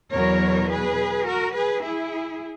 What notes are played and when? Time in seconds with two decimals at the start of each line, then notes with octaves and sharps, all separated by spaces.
0.12 E2 B2 F#3 A#4 C#5
0.70 G#4 B4
1.27 F#4 A#4
1.55 G#4 B4
1.83 E4 G#4